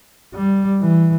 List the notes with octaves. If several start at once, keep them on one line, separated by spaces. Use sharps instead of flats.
G3
E3